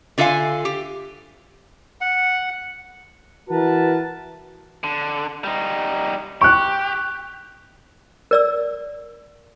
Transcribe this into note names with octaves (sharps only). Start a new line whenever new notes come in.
D3 F4 A4 E5 F5 G#5
G4
F#5
E3 F#4 A#4 B4 A5
D3
G3 D#4
G4 C#6 F#6
A#4 D5 E6